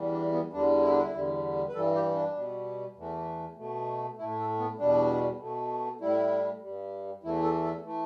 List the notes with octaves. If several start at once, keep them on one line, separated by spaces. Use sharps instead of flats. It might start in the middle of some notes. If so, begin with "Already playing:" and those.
Already playing: E2 E3 G3
D4
B3
E2 D3 G3 D4
E4
D4
E4
E2 D3 G3
B4
G2 E3 G3 A4
G4
D4
B2 G3
E2 E3 A3
B2 A3
A2 A3 E4
A4
B3
E2 B2 G3 D4
B2 A3
A2 G3 E4
G2 G3
E2 E3 A3 E4
A4
A4
E3 A3